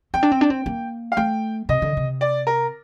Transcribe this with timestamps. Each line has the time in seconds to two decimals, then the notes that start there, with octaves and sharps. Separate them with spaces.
0.14 C4 G5
0.23 D4
0.32 C4
0.41 D4
0.50 C4
0.66 A#3
1.12 F5
1.17 A3 G5
1.69 C3 D#5
1.82 D3
1.97 C3
2.21 D5
2.47 A#4